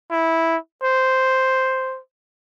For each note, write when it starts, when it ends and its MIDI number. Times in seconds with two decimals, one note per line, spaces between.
0.11 0.57 64
0.83 2.00 72